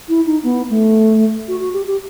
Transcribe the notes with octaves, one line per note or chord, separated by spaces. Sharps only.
E4
D#4
B3
A3
F#4
F#4
G4
G4